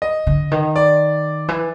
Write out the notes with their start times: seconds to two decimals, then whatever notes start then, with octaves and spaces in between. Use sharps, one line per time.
0.02 D#5
0.27 D3
0.51 D#3
0.76 D5
1.48 E3